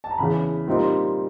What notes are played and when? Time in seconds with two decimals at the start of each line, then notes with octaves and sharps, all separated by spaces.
0.04 A5
0.11 A#5
0.18 E2 C#3 E3 B5
0.67 A#2 G3 C4 D#4